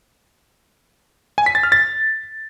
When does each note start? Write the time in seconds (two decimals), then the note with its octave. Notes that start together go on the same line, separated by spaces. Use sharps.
1.38 G#5
1.46 B6
1.55 A6
1.63 F6
1.72 A6